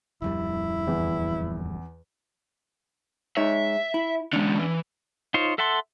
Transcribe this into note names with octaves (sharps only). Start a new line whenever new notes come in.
D1 F2 G3 E4
E2
G#3 D#4 C#5 E5
E4
E2 D3 G#3 C#4 D4
E3
D#4 F4 C5 C#5
A4 E5 F#5 A5 C6